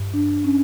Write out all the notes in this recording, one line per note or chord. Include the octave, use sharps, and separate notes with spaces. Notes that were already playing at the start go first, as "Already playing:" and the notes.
Already playing: G2
D4
C#4